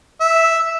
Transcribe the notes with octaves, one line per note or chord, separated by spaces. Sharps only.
E5